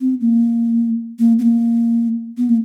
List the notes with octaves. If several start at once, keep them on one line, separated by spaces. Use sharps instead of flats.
C4
A#3
A#3
B3
A#3
B3
A#3